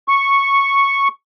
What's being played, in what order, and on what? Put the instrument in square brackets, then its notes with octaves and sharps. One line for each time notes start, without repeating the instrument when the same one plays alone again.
[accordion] C#6